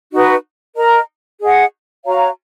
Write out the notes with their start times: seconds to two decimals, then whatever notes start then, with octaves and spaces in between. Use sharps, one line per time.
0.12 D#4 F#4 B4 D#5
0.76 A#4 D#5 A#5
1.41 G#4 D#5 F#5
2.06 F#4 C#5 F5 A#5